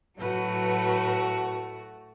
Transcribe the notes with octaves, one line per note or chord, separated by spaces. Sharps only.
A2 F#3 A3 F#4 B4